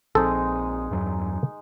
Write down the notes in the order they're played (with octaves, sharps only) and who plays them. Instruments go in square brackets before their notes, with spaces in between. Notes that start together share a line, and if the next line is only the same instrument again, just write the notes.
[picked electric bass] A#1 F3 C4 [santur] G#3 D#4 [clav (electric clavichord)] A4
[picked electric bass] E2 G2 F#3